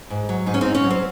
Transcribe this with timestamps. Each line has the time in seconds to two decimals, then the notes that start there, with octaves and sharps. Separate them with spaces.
0.10 G#2
0.29 F#3
0.46 G#2 D#4
0.54 C#4
0.61 G#2 C4 D#4
0.75 C#4
0.84 F#3
0.91 C4